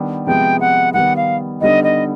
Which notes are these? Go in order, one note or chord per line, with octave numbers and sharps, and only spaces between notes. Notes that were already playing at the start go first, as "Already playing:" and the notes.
Already playing: D#3 G3 B3 D4 G4
C3 F3 G#3 B3 G5
F#5
D#3 G3 B3 F#5
F5
D3 G3 B3 D#4 D#5
D#5